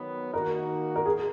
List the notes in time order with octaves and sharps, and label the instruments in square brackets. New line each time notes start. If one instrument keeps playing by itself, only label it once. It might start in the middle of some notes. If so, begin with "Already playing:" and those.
Already playing: [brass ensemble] D#3 F#3 B3
[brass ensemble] D#3 A#3 D#4 F#4 [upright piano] A#4
[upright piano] A#4
G#4